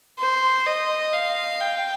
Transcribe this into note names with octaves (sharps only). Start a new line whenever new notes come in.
C5
D#5
F5
G5